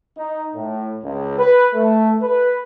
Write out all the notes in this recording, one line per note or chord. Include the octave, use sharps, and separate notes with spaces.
D#4
A2
C#2
B4
A3
B4